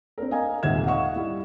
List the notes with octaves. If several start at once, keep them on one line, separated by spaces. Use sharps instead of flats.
C4 D4 A#4
D#5 F5 G#5 A#5
D#1 G#1 E5 G#6 E7
D#5 F5 F#5 C#6 E7
G3 E4